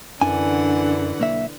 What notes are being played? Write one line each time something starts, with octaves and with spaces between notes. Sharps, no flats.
F#2 D3 E3 D4 F#5 G#5
B1 A#3 E5